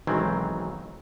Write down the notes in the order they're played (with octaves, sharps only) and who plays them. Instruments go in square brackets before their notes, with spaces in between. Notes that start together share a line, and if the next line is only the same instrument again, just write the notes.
[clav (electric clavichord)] B1 D#3 E3 F#3 G#3 C4